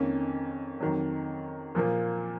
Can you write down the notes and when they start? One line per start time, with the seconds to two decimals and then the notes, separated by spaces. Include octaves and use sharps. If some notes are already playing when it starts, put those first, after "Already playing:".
Already playing: F2 D#3 A#3 C#4
0.80 F2 D#3 F#3
1.75 A#2 F3 A#3 F4